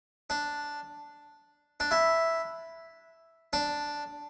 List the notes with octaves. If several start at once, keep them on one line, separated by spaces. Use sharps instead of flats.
D4
D4
E4
D4